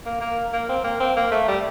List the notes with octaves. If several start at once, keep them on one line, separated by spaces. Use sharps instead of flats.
A#3
A#3
A#3
C4
A#3
C4
A#3
A3
G3